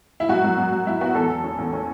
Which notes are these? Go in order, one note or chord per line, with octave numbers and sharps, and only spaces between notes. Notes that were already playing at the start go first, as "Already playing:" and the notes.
E4
F#2 F#4
F#2
F#2
F#2
F#2 E4
B3 F#4
E2 A4
E2
C#4
E2
C#4